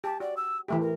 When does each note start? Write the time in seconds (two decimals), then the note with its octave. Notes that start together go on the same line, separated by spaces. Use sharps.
0.04 G4 A5
0.20 F#4 D5
0.36 E6
0.68 E3 A3 G4 E5
0.80 A#4